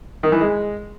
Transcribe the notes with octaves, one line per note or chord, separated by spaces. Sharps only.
D#3
E3
G#3